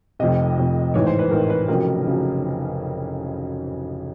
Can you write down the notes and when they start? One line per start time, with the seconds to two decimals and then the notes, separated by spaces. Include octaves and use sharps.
0.19 F1 F2 C3 D#5
0.57 F1 F2 C3
0.94 A1 G#2 E3 C#5
1.07 C5
1.19 B4
1.31 A1 G#2 E3 A#4
1.50 B4
1.68 F1 F2 C#3 F#3 A#4
2.07 C#3 F#3